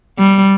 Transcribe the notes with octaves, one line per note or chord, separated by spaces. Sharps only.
G3